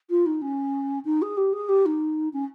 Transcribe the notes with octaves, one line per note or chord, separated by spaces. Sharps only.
F4
D#4
C#4
D#4
G#4
G4
G#4
G4
D#4
C#4